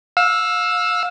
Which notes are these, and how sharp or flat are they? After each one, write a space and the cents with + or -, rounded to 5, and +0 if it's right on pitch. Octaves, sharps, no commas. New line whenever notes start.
F5 +35 E6 +0